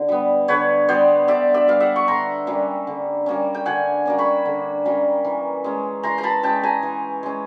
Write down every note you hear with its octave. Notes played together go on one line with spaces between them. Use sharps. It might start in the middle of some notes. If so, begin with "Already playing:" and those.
Already playing: D3
G3 B3
D3 B4 C#5
G3 B3 C5 D5
D3 D5 E5
D5 E5
G3 B3 F5
E5 F#5
C#6
D3 A#5 C6
G3 A#3 C#4
D3
G3 A#3 C#4
G5
D3 F#5 G#5
G3 A#3 C#4
B5 C#6
D3
G3 A#3 C#4
E3
G#3 C#4
E3 A#5 C6
A#5
A5 B5
G#3 C#4 G5 A5
G#5 A#5
E3
G#3 C#4